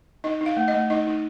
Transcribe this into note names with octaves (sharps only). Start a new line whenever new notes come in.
D#4 D#5
D#4
F5
A3
D#5
A3
D#4 D#5
D#4